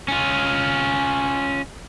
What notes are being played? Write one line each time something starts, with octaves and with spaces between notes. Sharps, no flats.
C#4 F4